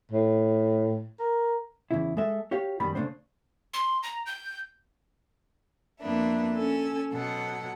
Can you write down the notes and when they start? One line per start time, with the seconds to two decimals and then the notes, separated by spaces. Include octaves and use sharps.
0.12 A2
1.19 A#4
1.91 E2 C#3 E4
2.17 G#3 A4 E5
2.51 F#4 G4 C#5 F5
2.80 F#2 D#3 G3 B3 B5
2.95 C#3 G#3 A3 D4 C5
3.74 C6
4.03 A#5
4.26 G6
6.00 F2 A#3 B3 D4 E5
6.56 C#4 A4 G#5 E6
7.13 B2 F#3 A4 F#5